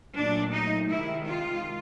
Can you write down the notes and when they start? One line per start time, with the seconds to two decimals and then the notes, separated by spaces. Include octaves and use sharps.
0.16 A#2 F#3 A3 D4
0.53 D#4
0.90 C3 D#3 G#3 E4
1.27 F4